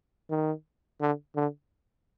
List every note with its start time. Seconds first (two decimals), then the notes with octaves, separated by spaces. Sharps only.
0.30 D#3
1.01 D3
1.36 D3